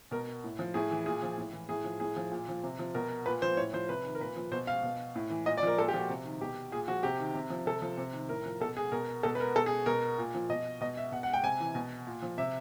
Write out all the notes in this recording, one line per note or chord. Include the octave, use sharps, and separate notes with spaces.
B2 A#4
A2
F3
A2 G#4
E3
A#2 G#4
F3
A2
E3
A2 G#4
F3
A2 G#4
F3
A#2
F3
C3
F3
B2 A#4
A#2 B4
F3 C5
A2 C#5
F3 C5
C3 B4
D#3
A#4
A#2 B4
F3
B2 C5
F5
B2
A2
E3
A#2 D#5
D5
F3 A#4
A#2 A4
G4
F3 F#4
C3
D#3
B2 G4
A#2 G#4
F3 F#4
C3 G4
D#3
C3
F3
C3 A4
F3
C3
D#3
A2 A#4
F3
B2 A4
G#4
B2 A#4
B2 A4
B4
A#4
B2 A4
G#4
B2 A#4
A#2
F3
B2 D#5
B2 D#5
E5
B2 F#5
F#5
G5
C3 G#5
E3
B2
A#2
F3
C3 E5